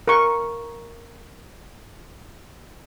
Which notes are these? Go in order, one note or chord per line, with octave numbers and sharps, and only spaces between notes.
A#4 C#6